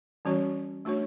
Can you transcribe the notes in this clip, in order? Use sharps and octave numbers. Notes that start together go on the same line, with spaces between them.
E3 G3 C#4 F#4 C#5
A3 D4 F#4 C#5